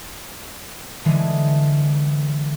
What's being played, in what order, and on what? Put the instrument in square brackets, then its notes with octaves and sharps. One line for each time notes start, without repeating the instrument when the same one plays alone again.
[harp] D3 E3 G#3